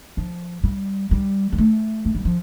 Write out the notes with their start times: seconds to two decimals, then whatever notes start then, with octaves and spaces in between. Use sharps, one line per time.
0.17 F3
0.64 G3
1.11 G3
1.52 G3
1.58 A3
2.05 A3
2.15 G3
2.25 F3